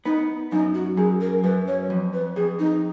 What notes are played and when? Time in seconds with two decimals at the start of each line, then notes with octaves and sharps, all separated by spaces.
0.05 B3 D#4
0.52 F#2 D#4
0.75 F#4
0.97 F#2 G#4
1.21 A#4
1.44 F#2 B4
1.68 C#5
1.90 F2
2.13 B4
2.36 F2 G#4
2.59 D#4